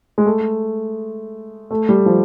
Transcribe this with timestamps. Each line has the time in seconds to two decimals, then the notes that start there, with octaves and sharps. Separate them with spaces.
0.18 G#3
0.26 A3
1.71 A3
1.89 G3
2.06 F3